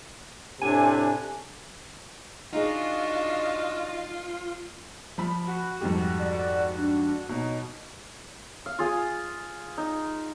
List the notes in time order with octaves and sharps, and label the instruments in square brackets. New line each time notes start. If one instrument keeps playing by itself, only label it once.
[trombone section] A2 C3 [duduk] D4 [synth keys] G#5
[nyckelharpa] D4 F#4 [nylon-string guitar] D#4 G#4 [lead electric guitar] F4 [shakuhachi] D#5
[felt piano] F3 B5
[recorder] F#4
[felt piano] F2 G#2 G3
[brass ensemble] D5
D4
[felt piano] B2 [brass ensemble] F#3 D#4
[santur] F5
F4 G#4 F5
D#4